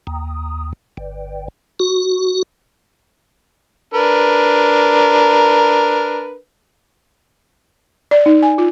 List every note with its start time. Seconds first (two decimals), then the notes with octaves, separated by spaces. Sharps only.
0.07 D#2
0.97 G1
1.80 F#4
3.94 D4 A#4 B4
8.11 D5
8.26 D#4
8.43 G#5
8.58 F4